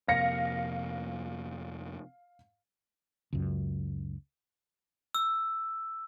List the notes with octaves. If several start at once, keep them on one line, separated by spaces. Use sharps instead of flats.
F2 C3 A#3 F5 A#6 C#7
C#2 F#2
E6